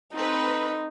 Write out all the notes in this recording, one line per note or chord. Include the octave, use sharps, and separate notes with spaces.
C4 D#4 A4 B4